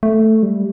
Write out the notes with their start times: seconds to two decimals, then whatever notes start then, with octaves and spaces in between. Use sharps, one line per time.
0.03 A3
0.43 G3